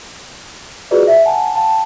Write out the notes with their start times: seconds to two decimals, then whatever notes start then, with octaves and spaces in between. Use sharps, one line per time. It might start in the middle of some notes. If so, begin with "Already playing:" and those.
0.91 F4 F#4 G#4 B4 D5 D#5
1.07 E5
1.25 F#5 G#5 A5
1.56 F5 G5 A5